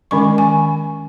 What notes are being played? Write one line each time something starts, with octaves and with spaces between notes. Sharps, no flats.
D#3 G#3 C#4 C#6
G#5